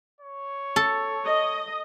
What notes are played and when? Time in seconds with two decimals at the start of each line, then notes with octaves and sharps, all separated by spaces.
0.21 C#5
0.76 A4
1.25 D#5